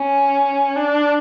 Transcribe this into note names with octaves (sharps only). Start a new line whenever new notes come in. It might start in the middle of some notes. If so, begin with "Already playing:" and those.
Already playing: C#4
D4